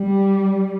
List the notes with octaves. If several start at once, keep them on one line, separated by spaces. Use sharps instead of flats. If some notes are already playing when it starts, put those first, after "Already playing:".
Already playing: G3